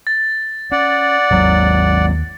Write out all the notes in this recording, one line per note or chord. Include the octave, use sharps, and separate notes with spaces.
A6
C#4 D5 F#5
G#1 D#2 F#3